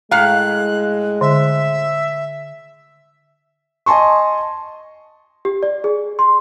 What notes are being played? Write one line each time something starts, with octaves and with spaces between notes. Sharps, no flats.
A2 G#3 F5 A#5 F#6
D3 E5
D#5 G#5 A5 C6 C#6
G4
D5
G#4
C6